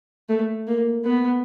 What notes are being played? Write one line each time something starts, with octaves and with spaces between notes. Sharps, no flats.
A3
A#3
B3